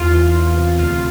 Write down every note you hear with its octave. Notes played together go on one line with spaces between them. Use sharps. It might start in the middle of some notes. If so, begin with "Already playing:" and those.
Already playing: E2 F4
E3
E2
C3
D2 F4